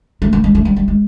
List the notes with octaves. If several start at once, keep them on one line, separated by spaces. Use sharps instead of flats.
A3
A3
G#3
A3
G3
G3
G#3